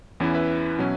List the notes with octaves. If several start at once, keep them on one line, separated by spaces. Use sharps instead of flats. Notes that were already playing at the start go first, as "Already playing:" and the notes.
E2 E3 C#4 E4
B4 E5
B2 F#3 C#4